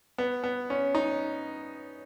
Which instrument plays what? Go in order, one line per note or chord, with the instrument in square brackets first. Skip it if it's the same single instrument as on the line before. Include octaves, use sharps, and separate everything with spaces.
[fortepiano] B3
B3
C#4
D#4